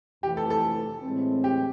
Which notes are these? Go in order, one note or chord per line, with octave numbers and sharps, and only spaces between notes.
F2 C3 E3 A3 G4
A4
A4
A2 E3 G#3 C4
G4